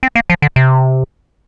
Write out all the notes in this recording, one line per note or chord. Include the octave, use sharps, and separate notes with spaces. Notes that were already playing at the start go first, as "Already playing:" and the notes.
C4
A#3
F3
D3
C3